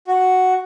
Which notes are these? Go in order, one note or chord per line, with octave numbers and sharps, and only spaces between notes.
F#4